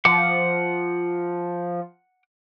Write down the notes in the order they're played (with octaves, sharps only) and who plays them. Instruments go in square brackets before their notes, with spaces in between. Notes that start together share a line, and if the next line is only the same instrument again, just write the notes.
[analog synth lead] F3 [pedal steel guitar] F#5 D6